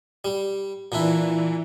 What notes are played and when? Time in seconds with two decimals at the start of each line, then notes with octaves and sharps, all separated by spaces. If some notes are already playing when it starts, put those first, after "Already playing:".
0.25 G3
0.92 A#2 E3 D4 E4